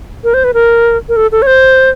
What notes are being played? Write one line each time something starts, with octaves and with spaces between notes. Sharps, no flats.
A#4
C5
B4
A#4
A#4
A4
A4
C#5
C5